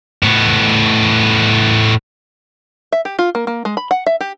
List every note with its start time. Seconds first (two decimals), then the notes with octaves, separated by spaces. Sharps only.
0.23 A2 B3
2.92 E5
3.05 G4
3.19 F4
3.35 A#3
3.47 A#3
3.65 G#3
3.77 B5
3.91 F#5
4.06 E5
4.21 G4